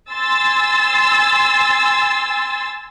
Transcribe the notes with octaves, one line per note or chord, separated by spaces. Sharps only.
G#5 C6 E6 A6